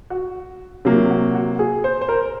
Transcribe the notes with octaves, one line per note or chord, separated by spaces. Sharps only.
F#4
C3 F#3 A#3 F4
F#4
F#4
G#4
C5
C5
A#4